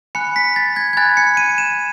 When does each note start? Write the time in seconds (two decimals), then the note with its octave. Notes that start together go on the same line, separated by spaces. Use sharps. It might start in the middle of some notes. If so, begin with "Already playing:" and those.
0.15 G#5 B5 F#6 C#7
0.36 B6
0.56 A6
0.76 G#6
0.93 G#6
0.97 G#5 B5 F#6 A6
1.17 C#7
1.37 D#7
1.58 E7